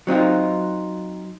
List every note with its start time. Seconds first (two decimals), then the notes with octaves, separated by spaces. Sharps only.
0.07 F#3 C4 D#4 F4